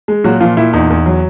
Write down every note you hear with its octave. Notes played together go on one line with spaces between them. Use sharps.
G#3
A#2 F#3 F#4
A#2 F3 F4
A#2 E4
E2 D#4
E2
F#3